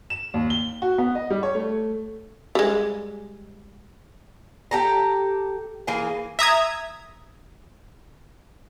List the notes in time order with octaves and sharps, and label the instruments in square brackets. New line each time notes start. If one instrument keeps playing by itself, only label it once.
[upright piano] E7
D#2
G7
F#4
B3
D#5
G3
C#5
A3
[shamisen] G3 G#3
[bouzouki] G4 A4 A#5
E3 A#3 G#4
[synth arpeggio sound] E5 A#5 D#6 G#6